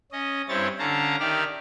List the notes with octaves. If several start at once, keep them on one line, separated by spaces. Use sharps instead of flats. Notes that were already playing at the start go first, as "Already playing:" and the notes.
C#4 D#5
G2 C4 E4 C#5 A6
D3 C#4 F5 A5 A#5
D#3 G4 D5 E5 F6